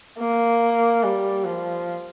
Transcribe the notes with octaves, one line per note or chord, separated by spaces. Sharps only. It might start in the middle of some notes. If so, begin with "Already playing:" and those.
A#3
G3
F3